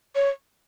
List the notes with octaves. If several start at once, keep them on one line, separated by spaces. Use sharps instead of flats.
C#5